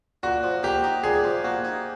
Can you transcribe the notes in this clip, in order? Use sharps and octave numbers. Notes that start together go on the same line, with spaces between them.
A#2 F#4
F3
A#3 G4
D#4
A#2 G#4
F3
A#3 F#4
D#4